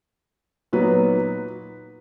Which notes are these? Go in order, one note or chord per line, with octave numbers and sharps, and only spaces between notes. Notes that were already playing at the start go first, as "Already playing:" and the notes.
A#2 F#3 B3 D#4 B4